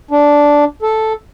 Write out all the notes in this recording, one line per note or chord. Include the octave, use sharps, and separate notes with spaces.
D4
A4